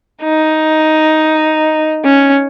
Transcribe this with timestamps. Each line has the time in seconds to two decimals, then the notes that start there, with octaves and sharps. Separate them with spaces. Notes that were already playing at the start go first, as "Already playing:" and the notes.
0.24 D#4
2.05 C#4